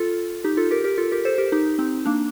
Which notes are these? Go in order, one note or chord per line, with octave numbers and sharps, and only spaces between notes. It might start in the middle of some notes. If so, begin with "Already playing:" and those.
Already playing: F4 A4
D#4 G4
F4 A4
G4 A#4
G4 A#4
F4 A4
G4 A#4
A4 C5
G4 A#4
D#4 G4
C4 D#4
A#3 D4